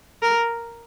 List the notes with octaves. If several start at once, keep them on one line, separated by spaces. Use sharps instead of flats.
A#4